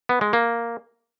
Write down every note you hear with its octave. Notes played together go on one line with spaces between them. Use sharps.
B3
G#3
A#3